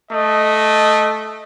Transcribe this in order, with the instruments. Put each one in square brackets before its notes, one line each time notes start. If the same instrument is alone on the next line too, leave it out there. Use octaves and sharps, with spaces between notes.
[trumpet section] A3 D#5